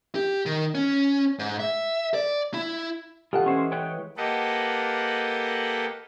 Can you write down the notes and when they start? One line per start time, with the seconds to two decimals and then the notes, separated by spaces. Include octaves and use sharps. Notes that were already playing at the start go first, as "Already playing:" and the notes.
0.15 G4
0.46 D#3
0.75 C#4
1.39 G#2
1.60 E5
2.14 D5
2.54 E4
3.33 E3 G#3 F4 G4 A4 F#5
3.46 C#4 C5 C#5
3.72 B4 C#5 G5
4.17 A#3 G4 A4 B4 D#5 F#5